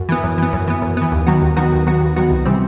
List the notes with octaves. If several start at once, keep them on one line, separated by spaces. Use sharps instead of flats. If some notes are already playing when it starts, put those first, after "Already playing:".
Already playing: F#2
E3 B3
F#2
E3 B3
F#2
E3 B3
F#2
E3 B3
D#2
D#3 F#3 B3 F#4
D#2
D#3 F#3 B3 F#4
D#2
D#3 F#3 B3 F#4
D#2
D#3 F#3 B3 F#4
C2
C3 E3 G3 C4